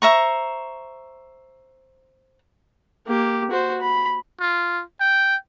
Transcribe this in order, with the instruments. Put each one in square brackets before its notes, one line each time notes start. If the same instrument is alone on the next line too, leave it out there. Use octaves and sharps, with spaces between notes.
[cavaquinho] C5 E5 A#5 C#6
[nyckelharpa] A#3 G4
F#4 C5
B5
[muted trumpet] F4
G5